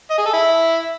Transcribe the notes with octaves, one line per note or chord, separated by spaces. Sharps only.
D#5
G#4
A4
E4